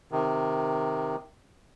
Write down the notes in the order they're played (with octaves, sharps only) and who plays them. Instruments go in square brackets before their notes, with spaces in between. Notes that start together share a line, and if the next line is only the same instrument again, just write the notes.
[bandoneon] C3 D#3